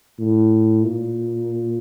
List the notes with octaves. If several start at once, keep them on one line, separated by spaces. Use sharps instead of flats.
A2
A#2